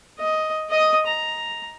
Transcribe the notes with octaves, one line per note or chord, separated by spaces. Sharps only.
D#5
D#5 D#6
A#5